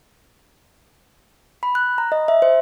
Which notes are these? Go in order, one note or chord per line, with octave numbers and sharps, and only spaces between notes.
B5
F#6
A#5
D#5
E5
C5